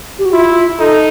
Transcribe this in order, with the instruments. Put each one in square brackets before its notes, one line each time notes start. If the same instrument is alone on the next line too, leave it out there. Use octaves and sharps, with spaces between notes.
[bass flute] G4
F#4
[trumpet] E4 [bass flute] F4
[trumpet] D#4 [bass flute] A4